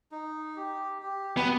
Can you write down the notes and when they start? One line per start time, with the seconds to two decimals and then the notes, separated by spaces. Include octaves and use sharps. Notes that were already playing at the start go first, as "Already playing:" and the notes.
0.11 D#4
0.56 G4
1.02 G4
1.37 B3